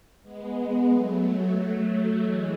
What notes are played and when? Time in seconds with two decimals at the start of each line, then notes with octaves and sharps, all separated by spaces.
0.22 G#3 B3
0.89 F#3 A3
2.21 E3 G#3